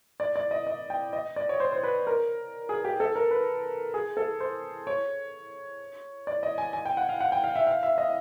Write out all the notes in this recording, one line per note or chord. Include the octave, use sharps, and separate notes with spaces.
D5
D5
D#5
D#5
G5
D#5
D5
C#5
C5
C5
B4
A#4
G#4
G4
A4
A#4
B4
G#4
A4
C5
C#5
D5
D#5
G#5
G#5
G5
F#5
F5
F#5
G5
F5
E5
F5
E5
D#5